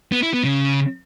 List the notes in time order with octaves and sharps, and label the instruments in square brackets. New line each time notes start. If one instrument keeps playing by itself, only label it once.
[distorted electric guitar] B3
E4
B3
C#3